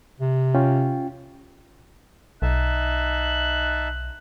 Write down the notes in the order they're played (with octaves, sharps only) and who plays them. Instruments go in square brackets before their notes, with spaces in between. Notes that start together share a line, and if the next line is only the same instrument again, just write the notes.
[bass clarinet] C3
[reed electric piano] C#4 F4 G5
[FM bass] B1 [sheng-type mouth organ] D#4 E5 A5 [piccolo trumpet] F#6